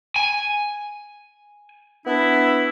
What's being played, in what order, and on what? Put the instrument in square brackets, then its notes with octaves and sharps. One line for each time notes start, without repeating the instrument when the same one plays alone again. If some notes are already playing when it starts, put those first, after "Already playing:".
[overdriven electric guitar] G#5
[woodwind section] B3 D4 E4